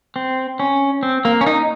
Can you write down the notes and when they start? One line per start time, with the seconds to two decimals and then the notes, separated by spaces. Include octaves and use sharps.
0.16 C4
0.60 C#4
1.03 C4
1.25 A#3
1.41 C#4
1.46 D#4